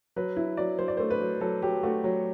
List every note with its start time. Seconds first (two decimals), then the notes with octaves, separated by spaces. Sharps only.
0.16 F#3 B4
0.37 E4
0.57 F#3 D5
0.79 F#3 C5
0.88 D5
0.97 A3 C5
1.10 B4
1.21 F#3
1.40 F#3 A4
1.62 F#3 G4
1.83 A3 F#4
2.04 F#3